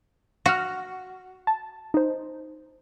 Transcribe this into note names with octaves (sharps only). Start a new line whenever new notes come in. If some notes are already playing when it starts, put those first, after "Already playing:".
F#4 F6 A#6
A5
D#4 C5